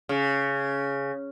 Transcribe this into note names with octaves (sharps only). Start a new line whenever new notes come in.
C#3